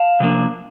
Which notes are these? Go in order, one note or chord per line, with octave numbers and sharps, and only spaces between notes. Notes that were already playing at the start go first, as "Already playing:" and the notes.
Already playing: F5 A5
C3 F3 A#3 D4